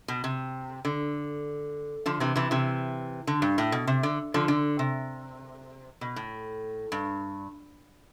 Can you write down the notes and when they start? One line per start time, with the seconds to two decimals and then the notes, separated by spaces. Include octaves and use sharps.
0.08 B2
0.24 C3
0.85 D3
2.06 D3 F3
2.20 C3 E3
2.36 C3 E3
2.51 C3 E3
3.27 D3
3.42 G2
3.58 A2
3.72 B2
3.87 C3
4.03 D3
4.34 D3 F3
4.48 D3
4.79 C3
6.01 B2
6.16 A2
6.92 G2